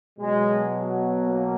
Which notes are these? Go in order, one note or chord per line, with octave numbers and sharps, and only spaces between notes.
B2 F#3 G#3
A#3